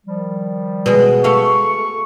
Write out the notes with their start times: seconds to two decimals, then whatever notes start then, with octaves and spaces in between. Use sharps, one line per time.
0.06 D#3 F3 G3
0.86 B2 G#3
1.24 A3 F5 C#6